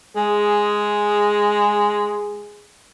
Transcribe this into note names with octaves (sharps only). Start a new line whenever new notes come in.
G#3 G#4